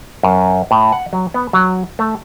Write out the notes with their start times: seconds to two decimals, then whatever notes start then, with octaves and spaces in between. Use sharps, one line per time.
0.23 F#2
0.71 A2
0.92 F#5
1.13 F#3
1.34 B3
1.53 F#3
1.99 A3